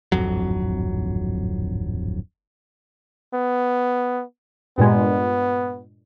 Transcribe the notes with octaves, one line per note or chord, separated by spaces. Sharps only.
D1 G#1 F2 F#3
B3
G2 A#2 G#3 B3